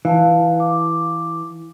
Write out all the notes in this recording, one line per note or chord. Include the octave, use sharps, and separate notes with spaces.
E3 F5 A5
D6